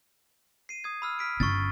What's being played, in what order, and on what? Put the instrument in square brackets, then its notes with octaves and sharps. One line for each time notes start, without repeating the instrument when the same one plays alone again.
[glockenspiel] C7 D#7
D#6 G#6
B5 E6 F6
F6 B6 D7
[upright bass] G1 C#4 [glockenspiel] C#6 A6